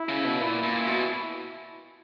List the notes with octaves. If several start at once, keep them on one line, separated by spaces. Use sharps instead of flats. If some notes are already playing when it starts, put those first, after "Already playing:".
Already playing: E4
C#3
B2
A#2 E4
A#2
B2